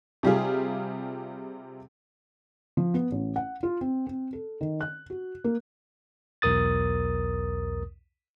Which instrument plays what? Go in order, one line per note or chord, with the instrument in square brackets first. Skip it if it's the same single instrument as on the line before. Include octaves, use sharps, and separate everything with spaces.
[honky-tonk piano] C3 G3 F4 G#4
[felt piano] F3
B3
A1
F#5
F4
C4
C4
A4
D#3
F#6
F#4
A#3
[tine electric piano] B1 E2 A#4 D#6 A6